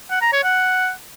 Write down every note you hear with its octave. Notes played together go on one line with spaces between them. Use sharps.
F#5
A#5
C#5
F#5